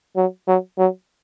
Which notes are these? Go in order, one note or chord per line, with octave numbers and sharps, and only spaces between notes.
F#3
F#3
F#3